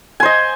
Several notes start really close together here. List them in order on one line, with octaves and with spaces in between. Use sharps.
G#5 C5 D#5